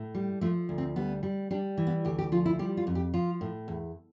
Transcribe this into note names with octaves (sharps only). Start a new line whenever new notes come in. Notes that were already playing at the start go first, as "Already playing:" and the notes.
Already playing: A2
G3
F3 A3
D2
C4
G3 B3
G3
G3 D4
E3
B3
D2 G4
G4
F3 F4
E4
G3 G4
F4
F2
G4
F3 F4
A2
E2